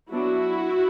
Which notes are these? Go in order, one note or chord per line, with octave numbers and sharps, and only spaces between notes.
F#3 B3 D4 E4 F#4